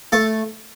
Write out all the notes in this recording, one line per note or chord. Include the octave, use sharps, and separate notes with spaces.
A3 A4